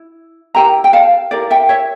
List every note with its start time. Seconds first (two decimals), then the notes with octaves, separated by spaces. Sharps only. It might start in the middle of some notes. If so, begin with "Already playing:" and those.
Already playing: E4
0.55 E4 G4 A#4 G5 A#5
0.84 G5
0.93 F5 A5
1.31 E4 G4 A#4 D5 F5
1.50 E5 G5
1.69 C#5 E5